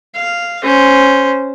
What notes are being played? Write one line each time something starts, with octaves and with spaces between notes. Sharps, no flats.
F5
C#4 C5